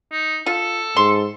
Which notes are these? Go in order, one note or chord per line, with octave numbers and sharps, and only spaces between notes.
D#4
F4 A4
G#2 C6